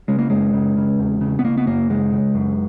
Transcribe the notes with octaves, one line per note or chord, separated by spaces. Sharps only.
C#3 G#3
A#3
F#2 G#3
C#3
C#3
E2
C#3
B3
C#3 A#3
B3
F#2 A#3
C#3 G#3
C#3
F#2